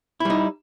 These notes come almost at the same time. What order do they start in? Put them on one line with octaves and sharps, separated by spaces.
E4 G3 D#4